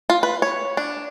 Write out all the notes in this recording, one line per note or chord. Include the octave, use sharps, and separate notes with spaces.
F4
B4
C#5
D4